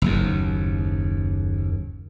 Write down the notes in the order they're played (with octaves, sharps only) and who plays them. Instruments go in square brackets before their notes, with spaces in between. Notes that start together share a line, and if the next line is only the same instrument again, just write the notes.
[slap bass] F#1 D#2